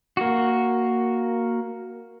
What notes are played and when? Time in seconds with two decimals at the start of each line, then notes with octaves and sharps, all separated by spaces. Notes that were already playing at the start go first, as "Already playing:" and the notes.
0.17 A#3 F#4